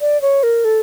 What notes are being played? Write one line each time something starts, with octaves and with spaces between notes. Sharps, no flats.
D5
C#5
A#4
A4